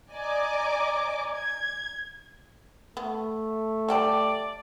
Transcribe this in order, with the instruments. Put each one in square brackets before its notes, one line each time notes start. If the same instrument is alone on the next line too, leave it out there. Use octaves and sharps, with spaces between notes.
[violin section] D5 D#5 G#5 A#5 D6
G#6
[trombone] A3 [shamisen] B3
[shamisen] G3 G5 A5 [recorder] D5